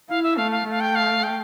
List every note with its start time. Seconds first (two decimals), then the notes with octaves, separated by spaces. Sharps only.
0.09 E4 F5
0.23 E5
0.37 A3 F5
0.52 F5
0.66 A3 F5
0.80 G5
0.95 F5
1.23 G5